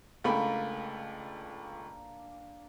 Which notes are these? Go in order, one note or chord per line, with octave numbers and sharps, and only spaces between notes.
C#2 A3 A#3 D4 G5 B5